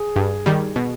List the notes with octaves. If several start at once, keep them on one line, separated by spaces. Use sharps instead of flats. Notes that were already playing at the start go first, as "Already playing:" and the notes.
Already playing: G#4
G2
D#3 G3
B2